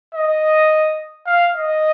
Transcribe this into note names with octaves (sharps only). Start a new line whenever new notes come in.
D#5
F5
D#5